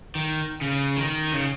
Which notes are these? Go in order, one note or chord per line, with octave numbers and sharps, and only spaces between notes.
D#3
C#3
D#3
C#3